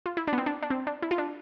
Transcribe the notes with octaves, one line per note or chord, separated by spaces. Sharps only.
F4
E4
D4
B3
C4
D4
D4
C4
D4
E4
F4
D4